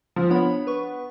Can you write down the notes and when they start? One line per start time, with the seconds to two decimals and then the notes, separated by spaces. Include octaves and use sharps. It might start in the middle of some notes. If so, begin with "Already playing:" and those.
0.16 F3
0.30 B3 D4 C#5 B5
0.67 B4 C#6